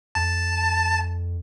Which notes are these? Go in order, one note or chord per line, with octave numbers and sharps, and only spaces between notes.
F2 A5